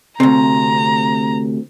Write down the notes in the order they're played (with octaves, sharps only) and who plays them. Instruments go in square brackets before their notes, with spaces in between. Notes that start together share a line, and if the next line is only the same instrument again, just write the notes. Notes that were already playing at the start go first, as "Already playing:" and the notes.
[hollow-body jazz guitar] D2 C3 [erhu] A#5